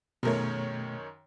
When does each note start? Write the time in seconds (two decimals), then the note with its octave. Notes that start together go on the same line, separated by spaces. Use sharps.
0.23 F#2 B2 D#3 A3 G#4 A#4 C#5